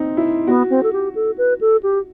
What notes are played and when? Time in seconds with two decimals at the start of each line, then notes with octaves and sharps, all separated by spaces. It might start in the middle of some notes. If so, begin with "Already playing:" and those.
Already playing: C4 D#4
0.17 E4
0.47 B3 F#4
0.70 C4
0.83 A4
0.93 G4
1.15 A4
1.38 B4
1.61 A4
1.83 G4